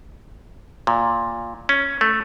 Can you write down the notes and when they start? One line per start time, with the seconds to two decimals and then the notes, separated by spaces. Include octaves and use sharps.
0.87 A#2
1.69 C#4
2.01 A3